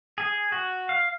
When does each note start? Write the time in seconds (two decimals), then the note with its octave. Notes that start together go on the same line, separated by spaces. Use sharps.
0.18 G#4
0.52 F#4
0.89 F5